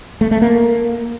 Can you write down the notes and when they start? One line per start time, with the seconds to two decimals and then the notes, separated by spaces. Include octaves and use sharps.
0.21 A3
0.31 A3
0.42 A#3